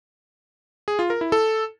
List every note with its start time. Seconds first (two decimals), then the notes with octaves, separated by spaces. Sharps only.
0.88 G#4
0.99 F4
1.10 A#4
1.21 E4
1.32 A4